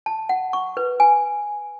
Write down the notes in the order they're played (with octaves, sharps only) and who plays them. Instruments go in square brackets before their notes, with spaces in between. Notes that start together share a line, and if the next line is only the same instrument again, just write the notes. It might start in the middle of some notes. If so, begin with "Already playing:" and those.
[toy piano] A5
F#5
C#6
B4
G#5